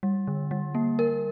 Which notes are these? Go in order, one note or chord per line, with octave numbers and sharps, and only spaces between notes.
G3
D3
G3
A#3
A#4